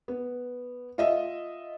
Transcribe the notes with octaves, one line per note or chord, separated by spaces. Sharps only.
B3
F4 D#5 E5